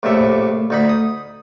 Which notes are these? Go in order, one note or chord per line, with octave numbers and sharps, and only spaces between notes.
A#1 A2 C3 E5
D2 D#4 B5
D#6